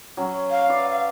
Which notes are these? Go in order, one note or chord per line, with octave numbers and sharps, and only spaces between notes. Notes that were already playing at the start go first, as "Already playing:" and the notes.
F#3 C#4
F5
B4 D5 E5
F5